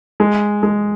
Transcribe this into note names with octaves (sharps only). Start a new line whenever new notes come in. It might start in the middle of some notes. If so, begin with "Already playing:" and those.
G#3
G#3